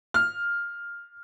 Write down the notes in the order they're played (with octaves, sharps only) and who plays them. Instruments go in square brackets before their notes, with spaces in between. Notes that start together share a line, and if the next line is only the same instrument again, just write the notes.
[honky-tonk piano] F6